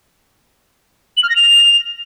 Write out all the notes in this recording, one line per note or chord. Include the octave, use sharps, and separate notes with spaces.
F#7
F6
A#6
F7